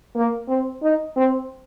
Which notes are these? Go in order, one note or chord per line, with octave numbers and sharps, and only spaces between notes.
A#3
C4
D#4
C4